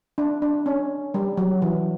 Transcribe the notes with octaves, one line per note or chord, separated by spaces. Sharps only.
D4
D4
C#4
G3
F#3
E3